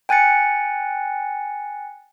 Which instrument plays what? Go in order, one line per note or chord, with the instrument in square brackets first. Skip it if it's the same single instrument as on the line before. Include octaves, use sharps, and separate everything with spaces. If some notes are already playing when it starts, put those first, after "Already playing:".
[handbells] G5 G#5 F#6 A6 C#7